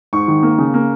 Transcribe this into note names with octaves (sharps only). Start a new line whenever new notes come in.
G#2 C#6
D#3
A#3
C#3
A#3